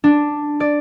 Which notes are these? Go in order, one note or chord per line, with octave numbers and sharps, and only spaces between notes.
D4
D5